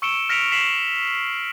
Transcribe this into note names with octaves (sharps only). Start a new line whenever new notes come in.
C#6 E6 C#7 D7 E7 G7
F6 A#6 B6 C#7 D7 F7
B6 C7 E7 F#7